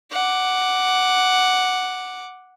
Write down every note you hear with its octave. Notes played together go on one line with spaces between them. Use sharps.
F#5 D6